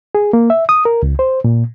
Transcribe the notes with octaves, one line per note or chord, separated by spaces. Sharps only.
G#4
A#3
E5
D#6
A#4
C#2
C5
A#2